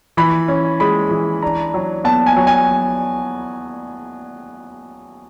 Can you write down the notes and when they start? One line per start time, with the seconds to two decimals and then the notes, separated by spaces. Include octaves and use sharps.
0.17 E3 B5
0.48 C#4
0.80 G#3 B5
1.11 E3
1.43 D4 A#5
1.74 F#3
2.04 B3 A5
2.26 G#5
2.36 F#3
2.47 G#5